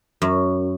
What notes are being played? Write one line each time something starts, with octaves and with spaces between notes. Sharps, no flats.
F#2